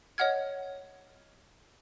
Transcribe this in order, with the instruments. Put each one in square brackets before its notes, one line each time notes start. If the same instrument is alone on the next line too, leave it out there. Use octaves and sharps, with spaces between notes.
[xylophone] C#5 D#5 F#5 F6 G#6